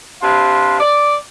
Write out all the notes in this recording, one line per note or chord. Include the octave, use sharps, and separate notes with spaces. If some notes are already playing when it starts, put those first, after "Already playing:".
C3 D4 B4 F5 C6
D5